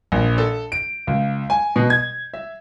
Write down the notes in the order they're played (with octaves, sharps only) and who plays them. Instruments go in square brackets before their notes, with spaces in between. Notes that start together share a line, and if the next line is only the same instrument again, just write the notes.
[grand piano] A#1
A4
D7
C#2
G#5
B2
G#6
E5